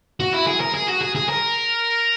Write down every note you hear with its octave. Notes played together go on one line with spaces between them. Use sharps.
F#4
E4
G#4
A#4
G#4
F#4
G#4
G#4
A#4